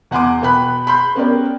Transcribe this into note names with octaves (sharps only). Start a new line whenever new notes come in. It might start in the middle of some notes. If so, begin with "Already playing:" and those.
E2 F#5 G#5 C6 D6
B2 B3 G5 B5 F#6
B5 C6 G6
B3 C#4 G4 A#4 D5